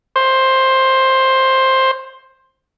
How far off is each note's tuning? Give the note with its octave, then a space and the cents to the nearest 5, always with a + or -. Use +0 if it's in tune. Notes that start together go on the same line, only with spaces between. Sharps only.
C5 +10